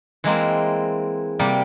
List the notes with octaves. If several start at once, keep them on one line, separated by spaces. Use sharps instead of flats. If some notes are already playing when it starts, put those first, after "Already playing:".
E3 G#3 A#3 C4
C3 G3 A#3